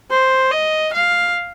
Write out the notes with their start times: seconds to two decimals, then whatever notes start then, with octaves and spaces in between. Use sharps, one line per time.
0.10 C5
0.51 D#5
0.93 F5